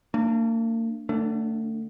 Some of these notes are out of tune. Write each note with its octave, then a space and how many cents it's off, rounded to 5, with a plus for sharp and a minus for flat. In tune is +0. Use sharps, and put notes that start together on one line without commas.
A#3 -40 D4 +0
D3 +30 A3 +30 D4 -30